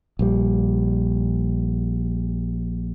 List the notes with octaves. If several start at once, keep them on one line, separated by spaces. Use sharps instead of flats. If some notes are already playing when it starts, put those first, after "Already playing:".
A#1 G3